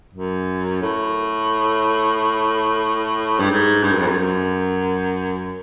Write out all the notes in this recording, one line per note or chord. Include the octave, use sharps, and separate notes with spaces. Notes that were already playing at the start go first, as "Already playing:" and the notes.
F#2
A2
G2
G#2
G2
F#2
F2
F#2
F#2